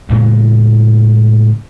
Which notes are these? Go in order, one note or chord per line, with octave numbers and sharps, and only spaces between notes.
A2 C#3 E3 G#3